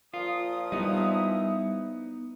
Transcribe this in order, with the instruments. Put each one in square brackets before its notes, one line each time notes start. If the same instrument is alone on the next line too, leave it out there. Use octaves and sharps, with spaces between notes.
[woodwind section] A#2 F3 D#6 [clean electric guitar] F4
[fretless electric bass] G3 [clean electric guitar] B3 D#4 [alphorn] E4